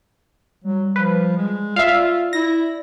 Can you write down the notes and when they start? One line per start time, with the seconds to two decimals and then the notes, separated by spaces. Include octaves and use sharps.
0.64 F#3 G3
0.96 F3 B4
1.37 G#3
1.76 F4 D5 E5 F5
2.33 E4 A#6